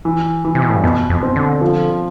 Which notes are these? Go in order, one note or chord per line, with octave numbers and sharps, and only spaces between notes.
E3
E3
C3
B2
A2
G2
F2 B2
F2
C4
D3
F3